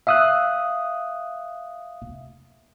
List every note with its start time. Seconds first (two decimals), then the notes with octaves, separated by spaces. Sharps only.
0.07 E5 F5 D#6 E6 F#6